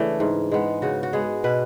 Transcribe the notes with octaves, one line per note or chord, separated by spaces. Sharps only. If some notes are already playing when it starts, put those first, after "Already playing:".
Already playing: C#3 E3 A3 D4
G#2
G#3 B3
C#3 F#4
F#4
G#3 B3 G#4
B2 B4